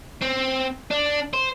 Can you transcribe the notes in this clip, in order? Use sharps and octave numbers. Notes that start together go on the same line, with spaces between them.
C4
D4
C5